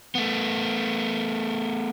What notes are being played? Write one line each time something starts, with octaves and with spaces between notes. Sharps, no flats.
A3 B3